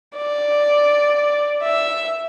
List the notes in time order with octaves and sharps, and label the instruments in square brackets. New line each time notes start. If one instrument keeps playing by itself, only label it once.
[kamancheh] D5
E5